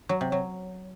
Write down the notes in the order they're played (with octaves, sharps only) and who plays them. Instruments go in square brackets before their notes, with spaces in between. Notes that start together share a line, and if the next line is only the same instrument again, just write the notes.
[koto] F#3
C3
F#3